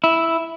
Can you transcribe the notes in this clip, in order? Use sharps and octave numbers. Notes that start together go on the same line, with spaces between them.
E4